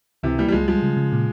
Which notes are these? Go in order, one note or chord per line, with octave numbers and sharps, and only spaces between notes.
C#2 C3 E3
E3 G3 A#3
G3
C#2 F3 G#3
F3 G3 G#3
C#3
C#3
A#2